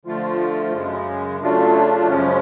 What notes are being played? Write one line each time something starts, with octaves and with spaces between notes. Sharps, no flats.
D3 F3 A3 F4
F#2 C#3 G#3
C#3 F#3 A3 D4 F4
F#2 C#3 F3 G#3 C#4